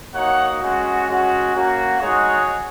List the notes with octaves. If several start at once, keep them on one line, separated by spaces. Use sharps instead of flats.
A#3 D#4 F#4 C#5 F#5
G#3 C#4 F#4
G#3 C#4 F#4
A#3 C#4 F#4
G#3 D#4 F#4 G#4 C#5